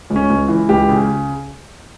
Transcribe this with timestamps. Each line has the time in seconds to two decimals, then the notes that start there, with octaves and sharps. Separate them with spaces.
0.10 C#2
0.16 C#4
0.29 C#2
0.48 E3
0.69 C#2 G4
0.89 C#3